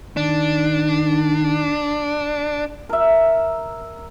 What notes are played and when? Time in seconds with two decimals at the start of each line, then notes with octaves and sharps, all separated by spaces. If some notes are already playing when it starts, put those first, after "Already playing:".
0.17 D#3 D4
2.89 A#4 E5